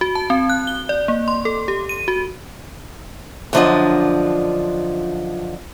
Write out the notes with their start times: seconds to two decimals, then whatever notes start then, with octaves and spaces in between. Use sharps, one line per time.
0.01 F#4
0.15 A5
0.30 C4
0.50 F#6
0.67 G7
0.89 D5
1.08 A#3
1.28 C6
1.45 A4
1.68 G4
1.89 D#7
2.08 F#4
3.53 F#2 D3 F3 D4 F4 D#5